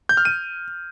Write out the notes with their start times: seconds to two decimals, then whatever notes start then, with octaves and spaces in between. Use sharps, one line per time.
0.09 G6
0.17 F6
0.25 D#7